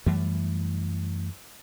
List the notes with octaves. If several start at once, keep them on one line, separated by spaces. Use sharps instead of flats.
F#2 E3 G3 A3